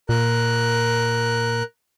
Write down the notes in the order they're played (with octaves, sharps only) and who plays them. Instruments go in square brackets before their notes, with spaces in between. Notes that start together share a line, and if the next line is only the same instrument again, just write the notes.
[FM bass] A#2 [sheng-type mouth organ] A#4 F#6